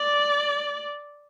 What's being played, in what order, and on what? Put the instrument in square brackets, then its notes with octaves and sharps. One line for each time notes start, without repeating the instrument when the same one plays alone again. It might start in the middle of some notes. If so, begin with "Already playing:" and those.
Already playing: [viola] D5